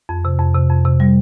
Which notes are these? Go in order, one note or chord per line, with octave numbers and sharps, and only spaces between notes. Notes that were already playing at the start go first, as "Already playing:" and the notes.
F2
C3
F2
C3
F2
C3
G3